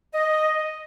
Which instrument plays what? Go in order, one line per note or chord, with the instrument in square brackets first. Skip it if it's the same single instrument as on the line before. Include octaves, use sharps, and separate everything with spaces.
[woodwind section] D#5